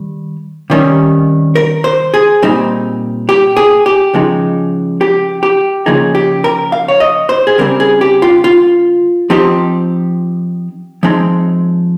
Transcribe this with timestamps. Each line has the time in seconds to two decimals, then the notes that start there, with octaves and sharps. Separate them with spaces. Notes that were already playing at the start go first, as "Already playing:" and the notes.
Already playing: D#3 G3
0.70 C3 D#3 G3 C#4
1.55 A#4
1.84 C5
2.14 G#4
2.42 A#2 G3 C4 D#4
3.29 G4
3.57 G#4
3.86 G4
4.14 C#3 F3 G#3 D#4
5.01 G4
5.43 G4
5.86 C#3 F3 A#3 D#4 G#4
6.15 G4
6.44 A#4
6.72 F5
6.88 C#5
7.00 D#5
7.29 C5
7.47 G#4
7.58 C#3 G3 C4 A#4
7.80 G#4
8.01 G4
8.22 F4
8.44 F4
9.30 F3 C4 D#4 G4
11.03 F3 G#3 C4 D#4